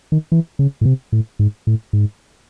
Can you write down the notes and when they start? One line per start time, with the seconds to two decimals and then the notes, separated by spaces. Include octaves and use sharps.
0.12 D#3
0.32 E3
0.59 C#3
0.81 A2
0.85 C3
1.12 A2
1.39 G#2
1.67 A2
1.93 G#2